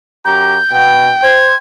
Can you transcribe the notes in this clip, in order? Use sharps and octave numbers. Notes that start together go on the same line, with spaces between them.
F#2 G4 A#5 G6
B2 G5
C5 G#6